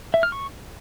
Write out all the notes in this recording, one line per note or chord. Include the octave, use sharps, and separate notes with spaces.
E5
F6
C#6